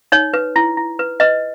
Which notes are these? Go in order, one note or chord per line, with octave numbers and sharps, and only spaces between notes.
D#4 C#5
B4
E4
E4
B4
B4 D#5